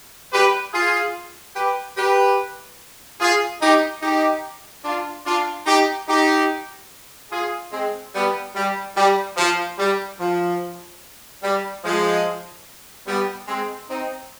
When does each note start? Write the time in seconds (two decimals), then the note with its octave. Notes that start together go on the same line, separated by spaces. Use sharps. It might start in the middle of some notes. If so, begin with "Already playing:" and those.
0.33 G4 B4
0.74 F4 G#4
1.56 G4 B4
1.97 G4 B4
3.20 F4 G#4
3.61 D#4 G4
4.02 D#4 G4
4.85 D4 F4
5.26 D4 F4
5.67 D#4 G4
6.08 D#4 G4
7.32 F4 G#4
7.72 G#3 C4
8.14 G3 B3
8.55 G3
8.97 G3
9.37 F3
9.78 G3
10.20 F3
11.43 G3
11.84 F3 G#3
13.07 G3 B3
13.48 G#3 C4
13.90 C4 D#4